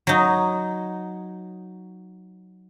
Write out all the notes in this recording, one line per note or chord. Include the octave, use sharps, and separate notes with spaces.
F#3 D#4